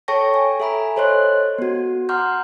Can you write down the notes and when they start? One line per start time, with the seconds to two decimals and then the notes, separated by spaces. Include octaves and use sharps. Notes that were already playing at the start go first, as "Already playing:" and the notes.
0.08 A4 C#5 G5 A5 C#6 A#6
0.34 G#5
0.60 A4 E5 G#5 A#5 B5
0.96 A4 C5 C#5 D#5 C6 F#6
1.58 B3 F#4
2.09 F#5 A#5 C6 D6 F6 G6